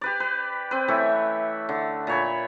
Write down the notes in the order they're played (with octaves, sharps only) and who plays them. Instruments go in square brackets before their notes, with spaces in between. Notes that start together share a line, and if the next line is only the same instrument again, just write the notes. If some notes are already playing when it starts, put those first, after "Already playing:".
[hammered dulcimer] G4 B4 D5
B4
C4 B4
E3 A3 C#5 E5
D3
A#2 C#5 B5